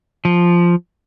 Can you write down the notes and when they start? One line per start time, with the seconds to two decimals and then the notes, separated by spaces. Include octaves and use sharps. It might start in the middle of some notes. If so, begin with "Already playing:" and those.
0.25 F3